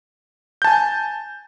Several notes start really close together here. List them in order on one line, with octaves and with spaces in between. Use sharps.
G6 A5 G#5